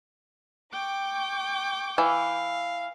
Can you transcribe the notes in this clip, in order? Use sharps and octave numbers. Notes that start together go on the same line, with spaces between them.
G5 C#6 D6
E3 F5